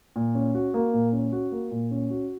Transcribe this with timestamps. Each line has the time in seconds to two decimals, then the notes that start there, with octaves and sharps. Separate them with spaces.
0.16 A#2
0.35 C#4
0.55 F#4
0.74 A#3
0.94 A#2
1.13 C#4
1.32 F#4
1.52 A#3
1.71 A#2
1.91 C#4
2.10 F#4